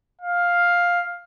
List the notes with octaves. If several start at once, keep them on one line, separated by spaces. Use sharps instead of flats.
F5